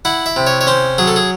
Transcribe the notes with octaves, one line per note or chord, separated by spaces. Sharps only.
E4 F#5
E5
C3
C#5
C#5
C#4 C5
F#3 G#4
A4
G#4